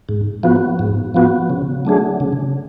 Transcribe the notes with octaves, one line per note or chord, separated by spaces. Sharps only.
G#2
F3 B3 F#4
G#2
F3 B3 F#4
C#3
F#3 A3 D4 G#4
C#3